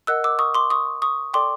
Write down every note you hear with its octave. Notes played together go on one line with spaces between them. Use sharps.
A#4 D#5 F#5 E6 F#6
D6 E6
C#6 D#6
C6 D6
C#6 D#6
C#6 D#6
A4 D5 G5 C6 D6